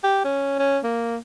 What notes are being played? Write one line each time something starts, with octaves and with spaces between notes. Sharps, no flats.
G4
C#4
C#4
A#3